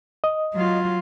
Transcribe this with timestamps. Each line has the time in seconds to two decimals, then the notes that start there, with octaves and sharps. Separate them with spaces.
0.24 D#5
0.55 F#3 F4